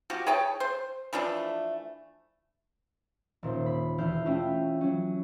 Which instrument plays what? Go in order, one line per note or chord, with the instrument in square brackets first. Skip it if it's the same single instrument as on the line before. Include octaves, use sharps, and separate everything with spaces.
[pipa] F3 F#4 G4
G#4 C#5 G5 A5
C5
E3 F3 A3 D4
[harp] D#1 A#2 C5
B5
E1 E4 F6 G6 C7
A3 C#4 E4 F4 G5
F#3 C#4